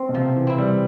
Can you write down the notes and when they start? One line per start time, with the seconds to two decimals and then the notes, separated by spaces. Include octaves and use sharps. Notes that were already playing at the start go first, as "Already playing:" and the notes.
Already playing: C4
0.09 B2
0.14 C3 F3
0.37 E3
0.47 C4 E4
0.58 G3